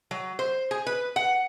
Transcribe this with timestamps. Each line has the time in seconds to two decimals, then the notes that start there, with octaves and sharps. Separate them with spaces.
0.11 F#3
0.39 C5
0.71 G#4
0.87 B4
1.16 F#5